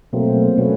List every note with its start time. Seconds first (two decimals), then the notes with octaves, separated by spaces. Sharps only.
0.13 B2 F#3 A3 A#3 C4
0.58 B2 F#3 A3 B3 C#4